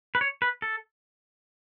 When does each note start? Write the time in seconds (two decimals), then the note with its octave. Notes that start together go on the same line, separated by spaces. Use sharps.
0.15 B4
0.21 C#5
0.42 B4
0.62 A4